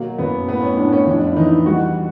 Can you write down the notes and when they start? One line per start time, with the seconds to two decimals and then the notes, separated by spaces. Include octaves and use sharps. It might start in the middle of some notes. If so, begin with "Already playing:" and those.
Already playing: B2 F#3 A#3
0.18 F#2 B3
0.47 A2 B3
0.62 C#4
0.77 A2 D4
0.93 C#4
1.07 F2 D4
1.27 E4
1.36 E3 D#4
1.66 G3 F#4